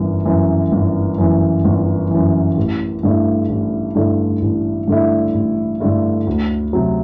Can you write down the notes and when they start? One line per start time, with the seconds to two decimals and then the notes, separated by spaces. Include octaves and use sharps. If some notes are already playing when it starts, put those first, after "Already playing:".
Already playing: G1 F#2 E3
0.25 F#2 E3
0.72 G1
1.18 F#2 E3
1.65 G1
2.11 F#2 E3
2.57 A1
3.03 G2 D3 A3 E4
3.49 A1
3.95 G2 D3 A3 E4
4.42 A1
4.88 G2 D3 A3 E4
5.34 A1
5.80 G2 D3 A3 E4
6.27 D2
6.73 C3 F#3